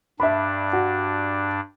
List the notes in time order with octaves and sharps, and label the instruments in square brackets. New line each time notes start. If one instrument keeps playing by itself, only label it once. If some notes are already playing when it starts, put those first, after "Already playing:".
[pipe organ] G2 D4 [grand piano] E5 B5
[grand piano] F#4